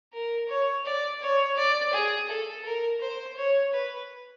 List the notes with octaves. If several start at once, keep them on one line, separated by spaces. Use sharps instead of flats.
A#4
C#5
D5
C#5
D5
G#4
A4
A#4
C5
C#5
B4